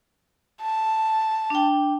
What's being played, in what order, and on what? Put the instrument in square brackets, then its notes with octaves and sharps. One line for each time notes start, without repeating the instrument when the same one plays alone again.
[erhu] A5
[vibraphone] D4 G5